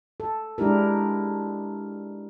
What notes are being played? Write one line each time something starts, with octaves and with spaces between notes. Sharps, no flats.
A4
G#3 D4 E4 G4 A#4